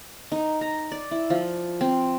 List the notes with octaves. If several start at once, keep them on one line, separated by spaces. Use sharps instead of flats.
D#4
A#5
D5
E4
F3
C4